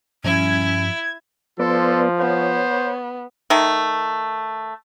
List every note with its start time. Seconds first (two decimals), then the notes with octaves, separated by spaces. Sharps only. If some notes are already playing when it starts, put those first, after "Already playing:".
0.24 G2 F3 G3 C#4 E4 G#6
1.60 F3 B3 A4 B4 D5 C6
2.20 B3 C5 C#5
3.50 D#3 A3